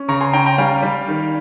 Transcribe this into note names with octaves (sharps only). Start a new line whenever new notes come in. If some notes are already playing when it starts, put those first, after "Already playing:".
Already playing: C#4
C#3 A#5 C#6
G#5 C6
C#4 G5 A#5
G5 A#5
G3 F5 G#5
G3
D#3